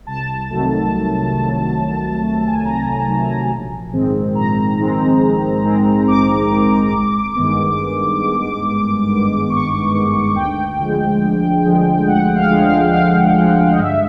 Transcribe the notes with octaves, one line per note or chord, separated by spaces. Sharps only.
C2 A5
C3 D#3 F#3 A3
C2
C3 D#3 F#3 A3
C2
C3 D#3 F#3 A3
G#5
A5
C2 A#5
C3 D#3 F#3 A3
A#1
G#2 D#3 G#3 C4
A#1 A#5
G#2 D#3 G#3 C4
A#1
G#2 D#3 G#3 C4
A#1 D6
G#2 D#3 G#3 C4
G#1
G2 D#3 G#3 B3
G#1
G2 D#3 G#3 B3
G#1
G2 D#3 G#3 B3
D6
G#1 C#6
G2 D#3 G#3 B3
D2 G5
D3 F3 G#3
D2
D3 F3 G#3
D2 F#5
F5
D3 F3 G#3
F5
D2 F5
D3 F3 G#3
D#5
G2 E5